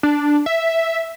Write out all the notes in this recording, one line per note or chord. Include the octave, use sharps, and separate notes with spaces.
D4
E5